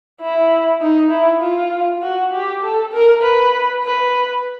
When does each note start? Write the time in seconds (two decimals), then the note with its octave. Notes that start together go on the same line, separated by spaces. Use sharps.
0.21 E4
0.81 D#4
1.11 E4
1.41 F4
2.02 F#4
2.33 G4
2.63 A4
2.93 A#4
3.23 B4
3.84 B4